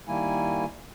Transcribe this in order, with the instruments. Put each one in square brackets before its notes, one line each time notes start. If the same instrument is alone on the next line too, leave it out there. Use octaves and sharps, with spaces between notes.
[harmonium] D#3 G3 A#3 E4 G#5